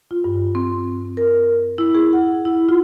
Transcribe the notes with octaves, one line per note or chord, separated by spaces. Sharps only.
F4
G2
C4
A#4
E4
G#4
F#5
E4
F4